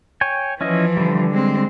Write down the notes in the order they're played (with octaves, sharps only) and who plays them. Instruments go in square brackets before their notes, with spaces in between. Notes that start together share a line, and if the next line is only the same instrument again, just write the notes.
[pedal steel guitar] C#5 G5 G#5
[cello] E3 F3 [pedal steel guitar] C#4 E4 D#5
[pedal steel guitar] D3 G3
[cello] G#3 C4